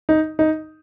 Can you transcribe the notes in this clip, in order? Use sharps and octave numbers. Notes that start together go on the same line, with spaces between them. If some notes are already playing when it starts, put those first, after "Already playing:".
D#4
D#4